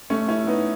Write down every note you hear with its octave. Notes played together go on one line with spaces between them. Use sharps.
A3 C#4
C#4 E4
B3 D#4